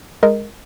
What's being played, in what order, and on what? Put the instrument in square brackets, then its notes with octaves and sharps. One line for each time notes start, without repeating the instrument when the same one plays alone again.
[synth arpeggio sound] G#3 A#4 D#5